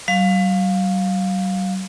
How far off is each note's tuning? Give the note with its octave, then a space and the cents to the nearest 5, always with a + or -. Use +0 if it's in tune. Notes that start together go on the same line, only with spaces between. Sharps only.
F#3 +45 F5 +15